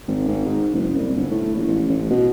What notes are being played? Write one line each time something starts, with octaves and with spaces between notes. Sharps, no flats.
G#1
G#1
G#2
F#1
C2
G1
A2
A#1
A1
A1
B2